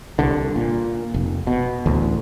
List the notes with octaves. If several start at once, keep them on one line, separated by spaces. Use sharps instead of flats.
C2 D3
A#2
F1
B2
A1 D2